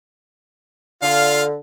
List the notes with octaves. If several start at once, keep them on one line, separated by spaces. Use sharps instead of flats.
D3 F4 F5